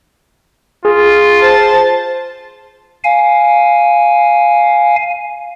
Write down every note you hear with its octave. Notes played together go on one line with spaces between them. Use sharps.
F4 G#4
C5 A5
F5 G#5